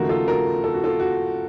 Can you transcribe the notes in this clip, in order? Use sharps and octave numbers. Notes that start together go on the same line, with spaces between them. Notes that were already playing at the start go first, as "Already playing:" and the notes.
Already playing: D#2 C#3 F3 A3 F#4 A#4
F4 A4
F#4 A#4
A4
F#4
F4 A4
F#4